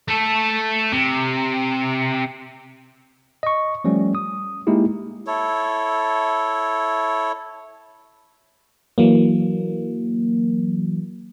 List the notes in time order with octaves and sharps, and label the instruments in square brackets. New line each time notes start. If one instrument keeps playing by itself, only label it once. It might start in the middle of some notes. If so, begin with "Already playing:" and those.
[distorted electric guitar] A3 A4
C3
[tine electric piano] D#5 C#6
F3 G3 A3 C#4
D#6
G#3 A#3 D#4 E4 G4
[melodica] E4 A4 C#5
[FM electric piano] E3 F#3 A#3